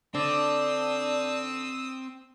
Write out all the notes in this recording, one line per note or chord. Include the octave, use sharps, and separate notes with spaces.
D3 C4 D4 D#6 E6